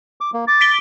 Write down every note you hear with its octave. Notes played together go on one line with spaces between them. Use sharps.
D6
A#3
D6 A6
B6 D7 G7